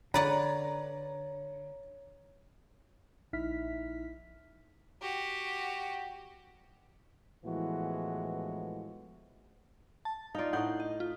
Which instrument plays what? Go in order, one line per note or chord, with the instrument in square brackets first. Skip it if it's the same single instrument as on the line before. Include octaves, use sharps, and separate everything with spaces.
[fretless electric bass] D3 [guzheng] B4 D5 F#5 [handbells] C#5 [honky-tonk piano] A#5
[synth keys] A#1 D#4 E4 E5 F6 B6
[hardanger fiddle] F#4 G4
[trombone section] A2 E3 F3 G#3 B3 F#4
[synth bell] A5
[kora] D#4 F4 [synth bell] D5 F5
[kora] A2 D#4 [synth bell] F#5 G6
[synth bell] D#5
F4